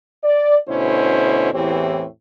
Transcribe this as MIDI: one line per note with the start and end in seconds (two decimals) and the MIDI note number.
0.24 0.57 74
0.68 1.52 38
0.68 1.52 47
0.68 1.52 50
0.68 1.52 61
0.68 1.52 64
0.68 1.52 72
1.53 2.05 40
1.53 2.05 45
1.53 2.05 52
1.53 2.05 60
1.53 2.05 67
1.53 2.05 73